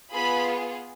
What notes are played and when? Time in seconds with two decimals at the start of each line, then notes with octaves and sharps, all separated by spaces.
0.12 B3 F4 G#4 B5